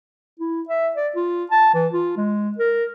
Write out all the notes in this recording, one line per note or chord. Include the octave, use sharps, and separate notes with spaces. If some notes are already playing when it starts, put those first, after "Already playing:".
E4
E5
D5
F4
A5
E3
F4
G#3
A#4